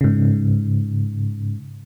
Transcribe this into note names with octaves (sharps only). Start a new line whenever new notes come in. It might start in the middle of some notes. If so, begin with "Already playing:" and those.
G#2 C#3